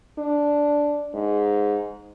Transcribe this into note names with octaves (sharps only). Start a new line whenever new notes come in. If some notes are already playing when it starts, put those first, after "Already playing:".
D4
G#2